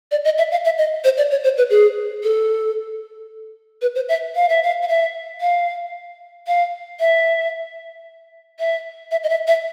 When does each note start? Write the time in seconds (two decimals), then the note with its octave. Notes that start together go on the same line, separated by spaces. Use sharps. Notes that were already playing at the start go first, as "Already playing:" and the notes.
0.11 D5
0.25 D#5
0.38 E5
0.51 F5
0.65 E5
0.78 D#5
1.04 C5
1.17 D5
1.31 C#5
1.44 C5
1.57 B4
1.70 G#4
2.24 A4
3.82 B4
3.95 C5
4.09 E5
4.35 F5
4.49 E5
4.63 F5
4.82 F5
4.88 E5
5.41 F5
6.47 F5
7.00 E5
8.59 E5
9.11 E5
9.23 D#5
9.29 E5
9.47 E5